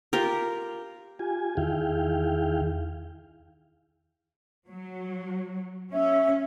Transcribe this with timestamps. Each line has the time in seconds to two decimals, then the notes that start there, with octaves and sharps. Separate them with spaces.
0.13 F4 G4 A#4
1.19 F4 G4 G#5
1.57 E2 D#3 E4 G#4 F5 G5
4.69 F#3
5.93 C#4 E5